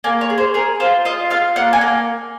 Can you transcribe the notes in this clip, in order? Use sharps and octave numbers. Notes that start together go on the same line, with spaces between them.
A#3 G#5
C#5
G#4
C5
G#4 A#4
F4 C5
F4 D#5
F4 F5
A#3 F#5
G#5
A#3